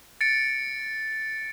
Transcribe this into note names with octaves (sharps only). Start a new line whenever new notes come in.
A6 C#7 D7